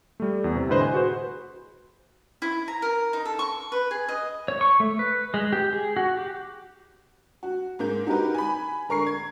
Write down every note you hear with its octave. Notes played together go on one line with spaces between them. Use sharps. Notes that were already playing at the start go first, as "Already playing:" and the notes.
G3 A3
E2
C3
A2 D3 B4 C5 D#5
G#5 F#6
F#4 G#4 B4 C5
E4
A#5
A#4
D#4
A4
C#6
B4
G#4
D#5
C#5
C#6
A3
B4
G#3
G4
G#4
F#4
G4
F#4
G#2 A#3 G6
D#4 F#4 G4 A#4 B4
G#5 B5
D3 A#4 C#6 C7
G#6